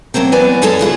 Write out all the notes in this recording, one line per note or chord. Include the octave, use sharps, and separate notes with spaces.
C#3 F#3 A3 A#3 C4
E3 F#3 B3 B4 D5 G#5
F#2 F#3 C#4 G#4 A4 A5
C#3 E3 F4 G#4